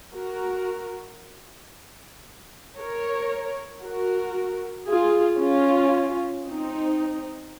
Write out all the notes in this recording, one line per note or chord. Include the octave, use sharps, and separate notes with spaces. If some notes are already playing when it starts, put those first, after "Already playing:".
F#4 A#4
A#4 C#5
F#4 A#4
F4 G#4
C#4 F4
C4 D#4